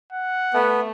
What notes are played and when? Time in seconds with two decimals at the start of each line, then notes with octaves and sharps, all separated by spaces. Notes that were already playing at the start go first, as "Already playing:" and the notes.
0.12 F#5
0.54 A3 B3